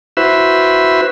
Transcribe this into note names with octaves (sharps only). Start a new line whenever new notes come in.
E4 F#4 B4 C5 E5